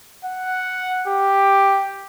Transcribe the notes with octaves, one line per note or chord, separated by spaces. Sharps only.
F#5
G4